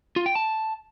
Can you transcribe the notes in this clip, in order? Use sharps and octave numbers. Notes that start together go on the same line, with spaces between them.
F4
G5
A5